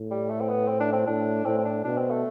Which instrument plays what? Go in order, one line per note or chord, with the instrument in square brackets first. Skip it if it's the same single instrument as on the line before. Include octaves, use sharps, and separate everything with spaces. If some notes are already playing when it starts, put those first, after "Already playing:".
Already playing: [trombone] A2
[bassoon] G3
A3
C4
B3
C4
D4
C4
[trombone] A2 [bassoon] D4
[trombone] A2 [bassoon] C4
[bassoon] C4
D4
[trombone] B2 [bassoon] D4
[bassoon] C4
A3